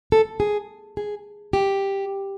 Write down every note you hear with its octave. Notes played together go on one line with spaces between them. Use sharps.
A4
G#4
G#4
G4